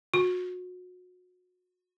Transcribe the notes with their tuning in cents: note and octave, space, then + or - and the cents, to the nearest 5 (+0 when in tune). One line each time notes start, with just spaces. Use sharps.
F#4 -35